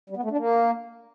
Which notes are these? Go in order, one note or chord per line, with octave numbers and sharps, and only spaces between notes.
G3
B3
A3
D4
A#3